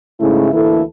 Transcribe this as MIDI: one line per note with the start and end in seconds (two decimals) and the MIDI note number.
0.20 0.51 44
0.20 0.51 49
0.20 0.51 57
0.20 0.51 64
0.52 0.82 38
0.52 0.82 52
0.52 0.82 58
0.52 0.82 64
0.52 0.82 69